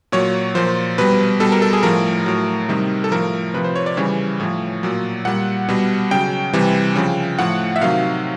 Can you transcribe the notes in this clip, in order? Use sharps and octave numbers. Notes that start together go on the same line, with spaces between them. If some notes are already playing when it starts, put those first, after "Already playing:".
A#2 F#3 C#5
A#2 F3 C5
B2 G3 B4
B2 G3 A4
A#4
A4
G#4
A2 F3 A#4
A2 F#3
C3 D#3 G3
A4
A2 F3 A#4
C3 F3 B4
C5
C#5
D5
C#3 E3 G3 C#5
A2 F3
A#2 F#3
A#2 G3 F#5
B2 G3
C#3 F#3 G5
C3 E3 G3
C#3 F3
A2 F3 F#5
E5
C3 D#3 F#3 F5